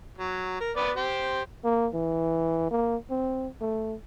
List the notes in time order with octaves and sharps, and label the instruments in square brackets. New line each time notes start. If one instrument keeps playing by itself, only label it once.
[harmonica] F#3
A#4
B3 B4 D5
G4 C5
[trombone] A#3
E3
A#3
C4
A3